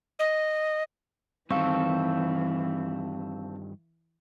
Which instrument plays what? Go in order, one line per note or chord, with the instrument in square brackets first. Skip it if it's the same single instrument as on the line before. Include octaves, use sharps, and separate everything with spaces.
[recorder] D#5
[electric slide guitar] G2 D#3 [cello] E3 [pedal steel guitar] C4 A4 [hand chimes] F5 C#6